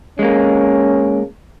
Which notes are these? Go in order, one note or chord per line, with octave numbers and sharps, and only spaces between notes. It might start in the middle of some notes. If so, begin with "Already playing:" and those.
G#3 A#3 C#4